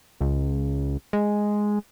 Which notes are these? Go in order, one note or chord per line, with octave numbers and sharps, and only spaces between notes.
C#2
G#3